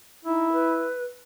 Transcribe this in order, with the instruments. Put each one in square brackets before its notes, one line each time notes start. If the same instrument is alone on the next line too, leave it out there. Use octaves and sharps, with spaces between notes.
[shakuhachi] D#4 [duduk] E4
[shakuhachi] B4